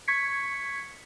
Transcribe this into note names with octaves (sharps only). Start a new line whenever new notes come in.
C#6 G#6 B6 C#7